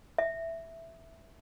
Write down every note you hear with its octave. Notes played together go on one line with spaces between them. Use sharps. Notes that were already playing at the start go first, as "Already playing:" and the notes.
E5